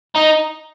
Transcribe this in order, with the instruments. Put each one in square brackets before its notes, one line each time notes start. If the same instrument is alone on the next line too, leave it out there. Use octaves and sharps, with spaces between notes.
[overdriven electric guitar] D#4